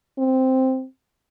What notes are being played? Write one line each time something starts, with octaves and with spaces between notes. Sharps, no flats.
C4